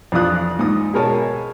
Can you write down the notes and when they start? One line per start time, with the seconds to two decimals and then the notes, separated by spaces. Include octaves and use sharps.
0.12 F2 E3 D4 F4 D#6 F#6
0.59 G#2 D#6
0.93 B2 G#3 A#4 C#5 G#5 A5